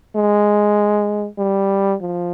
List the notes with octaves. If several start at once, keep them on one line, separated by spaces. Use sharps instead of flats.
G#3
G3
F3